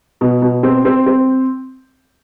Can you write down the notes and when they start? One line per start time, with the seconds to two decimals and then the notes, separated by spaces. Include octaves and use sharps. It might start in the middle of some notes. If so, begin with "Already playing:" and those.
0.21 B2
0.42 B2
0.63 C4
0.85 C4
1.06 C4